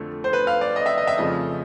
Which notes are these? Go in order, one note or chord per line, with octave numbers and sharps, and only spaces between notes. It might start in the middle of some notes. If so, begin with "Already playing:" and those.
Already playing: F2 D3 F3 A3
C5
B4
F5
D5
D#5
E5
D#5
E5
F2 C#3 F3 A3 D#5